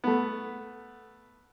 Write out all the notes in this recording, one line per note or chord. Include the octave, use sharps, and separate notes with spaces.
A3 B3